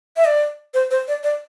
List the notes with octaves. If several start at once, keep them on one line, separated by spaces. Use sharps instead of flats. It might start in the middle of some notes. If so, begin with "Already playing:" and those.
E5
D5
C5
C5
D5
D5